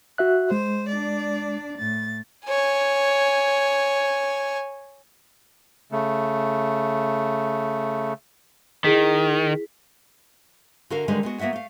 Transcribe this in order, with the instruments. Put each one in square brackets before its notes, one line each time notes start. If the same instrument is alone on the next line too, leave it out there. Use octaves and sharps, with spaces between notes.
[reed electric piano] F#4 E5 F#6
[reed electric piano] G#3 [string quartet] C5
[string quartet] D4 D5
A2 A6
[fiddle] C#5 G#5
[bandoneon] C#3 A3
[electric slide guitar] D#3 [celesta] E4 G#4 B6
[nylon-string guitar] D3 F#4 A#4 F5
D3 D#3 G3 G#3 B4
G#3 B3 F#4
A#3 B3 F#4 E5 F#5
A3 F5